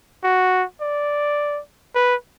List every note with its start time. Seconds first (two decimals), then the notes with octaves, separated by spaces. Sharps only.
0.24 F#4
0.81 D5
1.95 B4